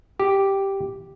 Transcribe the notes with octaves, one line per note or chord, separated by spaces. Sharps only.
G4